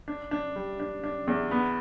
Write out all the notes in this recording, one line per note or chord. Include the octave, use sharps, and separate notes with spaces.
D4
D4
G3
D4
D4
E2
B3